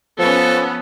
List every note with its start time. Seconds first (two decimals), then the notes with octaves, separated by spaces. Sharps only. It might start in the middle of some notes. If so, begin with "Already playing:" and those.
0.19 F3 B3 C#4 A4